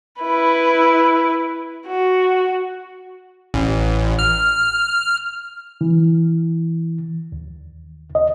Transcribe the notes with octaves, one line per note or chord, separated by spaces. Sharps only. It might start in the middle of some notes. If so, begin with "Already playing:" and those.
E4 B4
F#4
A1
F6
E3
D#2
D#5